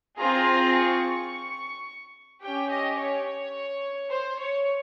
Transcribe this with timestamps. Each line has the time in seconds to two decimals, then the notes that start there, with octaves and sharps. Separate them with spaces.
0.18 C4 F4 G#4 A#5
0.75 C#6
2.42 C#4 G4 G5
2.70 D#5
2.98 C#5
4.10 C5
4.39 C#5